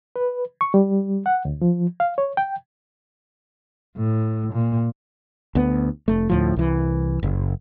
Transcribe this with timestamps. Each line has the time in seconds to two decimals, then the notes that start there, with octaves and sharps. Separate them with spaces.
0.16 B4
0.61 C#6
0.74 G3
1.26 F#5
1.45 D2
1.62 F3
2.00 F5
2.18 C#5
2.37 G5
3.97 A2
4.53 A#2
5.55 D2 B3
6.08 F1 A3
6.30 D2 A2 F3
6.56 C2 E3
7.23 F#1